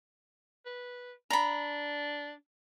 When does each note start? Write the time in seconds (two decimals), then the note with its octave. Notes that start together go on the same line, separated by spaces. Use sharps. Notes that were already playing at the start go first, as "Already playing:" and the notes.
0.65 B4
1.30 D4 A#5 B5